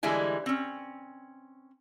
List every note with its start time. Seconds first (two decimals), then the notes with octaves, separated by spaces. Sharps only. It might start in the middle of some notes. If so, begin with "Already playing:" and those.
0.03 D3 E3 G3 G#3 E4 G#5
0.46 C4 C#4